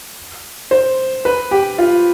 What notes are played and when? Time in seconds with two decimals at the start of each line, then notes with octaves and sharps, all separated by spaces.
0.71 C5
1.25 B4
1.51 G4
1.78 F4